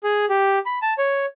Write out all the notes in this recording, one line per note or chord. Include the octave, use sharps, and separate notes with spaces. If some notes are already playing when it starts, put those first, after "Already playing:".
G#4
G4
B5
A5
C#5